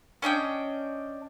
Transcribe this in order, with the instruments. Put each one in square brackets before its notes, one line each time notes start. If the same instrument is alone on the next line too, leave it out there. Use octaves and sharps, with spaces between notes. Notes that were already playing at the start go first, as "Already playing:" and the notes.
[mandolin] C#4 D4 D#5 G5